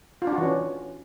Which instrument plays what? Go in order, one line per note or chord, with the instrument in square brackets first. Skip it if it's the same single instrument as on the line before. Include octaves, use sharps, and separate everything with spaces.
[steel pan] F4
D4
F#4
E3
C#4